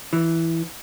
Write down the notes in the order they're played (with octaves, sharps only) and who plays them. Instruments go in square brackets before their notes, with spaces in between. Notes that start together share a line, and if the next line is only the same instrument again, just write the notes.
[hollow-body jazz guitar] E3